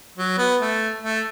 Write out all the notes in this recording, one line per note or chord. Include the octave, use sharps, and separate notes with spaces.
F#3
B3
A3
A3